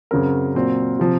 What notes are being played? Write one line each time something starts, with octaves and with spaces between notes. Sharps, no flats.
F#2 C#3 F#3 C4 A#4
A#2 F#3 C4
C3 F3 C4